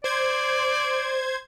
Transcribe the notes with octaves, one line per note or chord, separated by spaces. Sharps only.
C5 D5 G#6